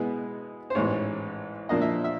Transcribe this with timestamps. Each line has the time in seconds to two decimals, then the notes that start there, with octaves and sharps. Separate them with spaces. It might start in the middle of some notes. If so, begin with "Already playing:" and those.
Already playing: B2 G#3 B3 E4
0.70 C5
0.75 A1 G#2 E3 C#5
1.69 A#2 F3 A#3 D4 D#5
1.81 E5
2.04 E5